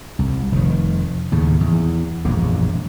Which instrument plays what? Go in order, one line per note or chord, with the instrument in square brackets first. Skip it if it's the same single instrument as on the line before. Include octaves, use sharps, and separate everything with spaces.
[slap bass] C2
F1 C3 D#3
D#2 A2 C#3
E2
E1 A#1 F#2 D3